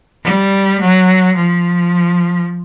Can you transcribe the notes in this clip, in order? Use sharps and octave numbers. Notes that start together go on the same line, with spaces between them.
G3
F#3
F3